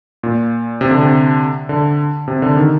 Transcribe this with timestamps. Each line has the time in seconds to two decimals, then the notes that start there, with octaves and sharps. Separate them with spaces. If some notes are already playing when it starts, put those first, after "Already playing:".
0.23 A#2
0.81 C3
0.91 D3
1.01 C3
1.69 D3
2.28 C3
2.42 D3
2.57 D#3